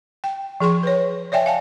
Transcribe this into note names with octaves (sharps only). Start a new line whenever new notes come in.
G5
F3 G#4 C6 C#6
B4 C#5
C#5 D5 E5 G5 G#5
F5 G#5 A5